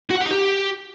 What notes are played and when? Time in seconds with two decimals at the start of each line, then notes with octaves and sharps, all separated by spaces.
0.10 F#4
0.16 F#5
0.21 G4
0.26 D#4
0.31 G4